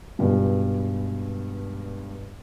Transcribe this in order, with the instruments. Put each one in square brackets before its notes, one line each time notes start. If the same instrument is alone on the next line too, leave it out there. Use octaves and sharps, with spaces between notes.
[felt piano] C#2 G2 B2